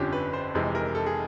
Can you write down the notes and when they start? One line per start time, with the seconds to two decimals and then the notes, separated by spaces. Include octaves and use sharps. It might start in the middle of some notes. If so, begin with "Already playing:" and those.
Already playing: G1 F2 D3 F3 C#4 G4
0.13 B4
0.33 C5
0.54 F1 F2 C3 E3 G#3
0.75 A#4
0.95 A4
1.06 G#4